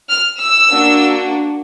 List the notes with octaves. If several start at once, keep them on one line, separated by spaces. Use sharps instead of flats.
F6
E6
A#3 D4 F#4